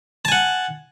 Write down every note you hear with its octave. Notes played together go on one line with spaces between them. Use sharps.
F#5 G#5 A5